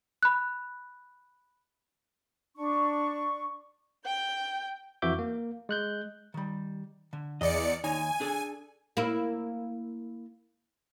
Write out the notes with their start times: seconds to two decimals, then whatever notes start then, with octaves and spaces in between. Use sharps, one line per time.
0.23 B5 F#6
2.56 D4 C#6
4.05 G5 G6
5.02 F2 E3 F#4 E5 D6 G6
5.19 A#3
5.69 G#3 F#6 G6
6.34 D#3 G3
7.13 D3
7.41 E2 D5 D#5 C#7
7.84 D#2 D#4 C#5 G#5
8.20 D4 G#4 A4
8.97 A#3 E4